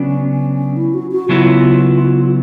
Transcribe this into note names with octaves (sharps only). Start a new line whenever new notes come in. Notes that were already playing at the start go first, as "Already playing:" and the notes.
Already playing: C#3 F#3 B3 C#4 D4
E4
F#4
F#4
C#3 F#3 B3 E4 F4